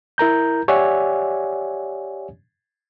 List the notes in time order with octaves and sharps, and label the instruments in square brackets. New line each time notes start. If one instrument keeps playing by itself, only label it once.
[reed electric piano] E4 A#4 A#5 G6
G4 C#5 D5 E5 F#5 G#5